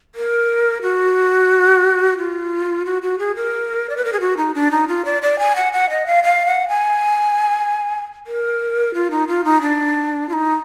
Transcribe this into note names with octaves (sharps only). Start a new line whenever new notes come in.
A#4
F#4
F4
F#4
F#4
G#4
A#4
D5
B4
A#4
G#4
F#4
D#4
D4
D#4
F4
D5
D5
G#5
F#5
F#5
D#5
F5
F5
F#5
G#5
A#4
F4
D#4
F4
D#4
D4
F4
D#4